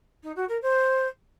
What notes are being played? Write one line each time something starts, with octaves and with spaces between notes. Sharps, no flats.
D#4
F#4
A#4
C5